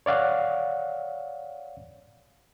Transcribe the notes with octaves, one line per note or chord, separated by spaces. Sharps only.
C#5 D5 F5 F#5